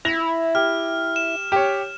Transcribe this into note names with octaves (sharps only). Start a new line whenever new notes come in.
E4 A#6 F7
G4 F6
E7
G4 C#5